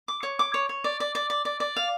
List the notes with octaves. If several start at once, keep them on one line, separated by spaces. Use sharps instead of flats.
D6
C#5
D6
C#5
C#5
D5
D5
D5
D5
D5
D5
F5